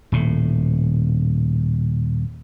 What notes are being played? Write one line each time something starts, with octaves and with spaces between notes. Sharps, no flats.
D#1 A2